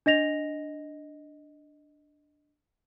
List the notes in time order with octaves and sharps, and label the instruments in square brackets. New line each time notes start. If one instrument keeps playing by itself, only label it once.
[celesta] D4 D#5 A#6 F7